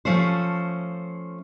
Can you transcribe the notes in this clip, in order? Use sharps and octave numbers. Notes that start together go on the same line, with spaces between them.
F3 A3 C#4 C5